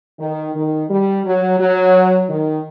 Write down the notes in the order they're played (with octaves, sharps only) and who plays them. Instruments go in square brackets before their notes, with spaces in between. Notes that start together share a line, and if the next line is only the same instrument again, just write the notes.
[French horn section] D#3
D#3
G3
F#3
F#3
D#3